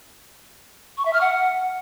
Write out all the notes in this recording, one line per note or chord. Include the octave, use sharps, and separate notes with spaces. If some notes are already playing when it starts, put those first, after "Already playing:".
C#6
E5
F6
F#5